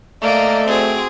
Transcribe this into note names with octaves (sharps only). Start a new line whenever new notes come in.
A3 A#3 D5 D#5 D7
C4 F#4 G#4